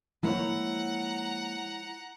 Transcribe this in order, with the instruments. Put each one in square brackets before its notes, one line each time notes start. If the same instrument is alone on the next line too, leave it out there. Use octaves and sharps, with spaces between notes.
[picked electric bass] F3 G#3 A#3 [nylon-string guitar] E4 C5 C#5 [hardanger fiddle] F#5 A#5